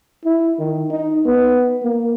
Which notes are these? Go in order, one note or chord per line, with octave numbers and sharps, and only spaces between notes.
E4
D#3
D#4
B3
A#3